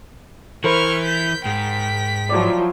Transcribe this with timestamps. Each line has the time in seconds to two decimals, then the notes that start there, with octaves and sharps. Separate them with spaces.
0.64 E3 A#4 C5 B5 C#6 F6
1.05 G6 B6
1.45 G#2 G5 B6
2.29 F3 F#3 E4 D5 D6